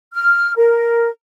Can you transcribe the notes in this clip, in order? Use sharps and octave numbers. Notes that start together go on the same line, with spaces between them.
F6
A#4